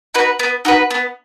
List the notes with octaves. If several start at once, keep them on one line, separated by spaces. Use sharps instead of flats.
D#4 F#4 B4
B3
D#4 F#4 B4
B3